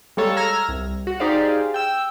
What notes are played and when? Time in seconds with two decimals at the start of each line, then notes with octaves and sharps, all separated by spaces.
0.17 G3 G#3 A#3 A4 C#5
0.37 A#5 E6 F6 G#6 A#6
0.69 C2
1.07 F#4
1.20 D#4 G4 G#4 C5 D5 F5
1.74 G5 E6